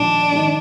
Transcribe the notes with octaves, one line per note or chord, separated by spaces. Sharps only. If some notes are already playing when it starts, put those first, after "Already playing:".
Already playing: A#1 G#2 D#3 D4
G#2 D#3